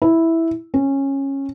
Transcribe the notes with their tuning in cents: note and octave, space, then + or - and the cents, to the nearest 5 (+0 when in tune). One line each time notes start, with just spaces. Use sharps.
E4 -5
C#4 -15